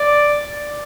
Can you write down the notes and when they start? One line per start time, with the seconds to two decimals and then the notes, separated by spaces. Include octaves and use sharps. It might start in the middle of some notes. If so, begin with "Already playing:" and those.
Already playing: D5